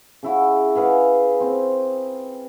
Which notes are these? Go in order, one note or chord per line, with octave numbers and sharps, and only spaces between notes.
C#3 E4 F#4
G#4 B4 F5 F#5
C4